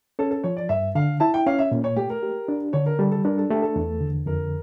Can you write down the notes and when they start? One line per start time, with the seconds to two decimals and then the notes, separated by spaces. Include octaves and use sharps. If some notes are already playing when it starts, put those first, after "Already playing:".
0.19 C#4 A4
0.31 A4
0.44 F3 C#5
0.57 D5
0.69 G2 E5
0.95 D3 F5
1.20 E4 A5
1.34 G5
1.46 C#4 F5
1.59 E5
1.71 A#2
1.84 C#5
1.96 A3 G4
2.10 A#4
2.23 G4
2.48 D4
2.73 D3 C#5
2.86 A#4
2.99 G3 A4
3.11 A4
3.25 D4 A#4
3.38 A4
3.50 A3 G4
3.62 A4
3.76 E2
4.01 D3
4.26 F2 A#4